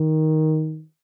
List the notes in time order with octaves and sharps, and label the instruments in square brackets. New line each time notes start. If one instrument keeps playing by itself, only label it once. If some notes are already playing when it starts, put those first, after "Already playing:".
Already playing: [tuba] D#3